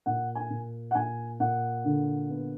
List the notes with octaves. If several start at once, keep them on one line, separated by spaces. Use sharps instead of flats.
A#2 F#5
G#5
A#2
F#5
A#2 G#5
A#2 F#5
D3
B3